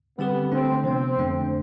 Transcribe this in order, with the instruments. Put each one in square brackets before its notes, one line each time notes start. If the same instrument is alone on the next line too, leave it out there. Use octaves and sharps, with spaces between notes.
[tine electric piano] D3 G3 C4 G4 B4 [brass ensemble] B3
[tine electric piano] D3 A3 D4 [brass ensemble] C4
[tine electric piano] C3 F3 B3 [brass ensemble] C4
[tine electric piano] F2 D3 A3 D4